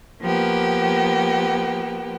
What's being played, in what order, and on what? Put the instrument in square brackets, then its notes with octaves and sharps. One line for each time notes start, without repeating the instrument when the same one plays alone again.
[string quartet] F3 A#3 B3 G4